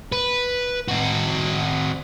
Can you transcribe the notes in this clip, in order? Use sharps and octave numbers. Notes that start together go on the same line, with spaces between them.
B4
C4 F#4